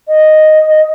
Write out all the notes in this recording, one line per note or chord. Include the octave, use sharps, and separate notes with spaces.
D#5